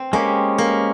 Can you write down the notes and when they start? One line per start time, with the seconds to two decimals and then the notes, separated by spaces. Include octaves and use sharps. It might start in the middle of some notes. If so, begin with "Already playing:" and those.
Already playing: C4
0.13 G#3 A#3 C#4 G4
0.58 A#3